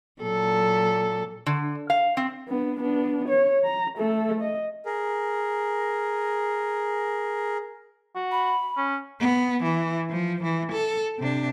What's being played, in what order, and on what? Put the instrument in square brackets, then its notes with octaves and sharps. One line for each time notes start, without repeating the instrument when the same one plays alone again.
[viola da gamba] A#2 F#3 A4
[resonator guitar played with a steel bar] D3
F5
C4
[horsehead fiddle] B3 D4
B3 D4
C#5
A#5
A3 A4
D#5
[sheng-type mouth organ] G#4 A#4
[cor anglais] F#4
[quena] B5
[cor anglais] C#4
[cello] B3
E3
F3
E3
A4
C3 D4